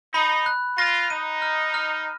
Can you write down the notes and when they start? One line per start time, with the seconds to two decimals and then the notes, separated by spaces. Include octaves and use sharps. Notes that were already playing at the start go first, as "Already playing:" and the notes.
0.14 D#4 B5
0.46 F#6
0.77 F4 A#6
1.10 D#4 D#7
1.42 F6
1.74 F6